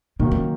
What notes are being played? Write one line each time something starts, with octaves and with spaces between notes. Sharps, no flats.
A#2 D#3 F#3 A#3
C#3